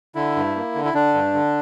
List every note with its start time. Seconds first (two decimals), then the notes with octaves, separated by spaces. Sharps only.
0.15 D3 E4
0.36 G2
0.56 A#3
0.75 D3
0.85 E4
0.94 D3 D4
1.14 G2
1.34 D3